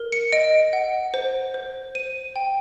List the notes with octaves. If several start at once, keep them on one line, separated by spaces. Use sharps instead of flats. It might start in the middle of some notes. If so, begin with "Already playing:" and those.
Already playing: A#4
C#7
D#5 D7
F#5
C5
C5
C5 D#7
G5